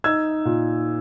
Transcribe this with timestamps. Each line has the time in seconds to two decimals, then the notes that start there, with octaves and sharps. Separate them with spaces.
0.04 D#4 E6 G#6
0.45 A#2